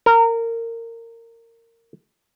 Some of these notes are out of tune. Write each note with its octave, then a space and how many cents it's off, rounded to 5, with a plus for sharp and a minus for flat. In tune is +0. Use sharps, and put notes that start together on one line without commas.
A#4 -20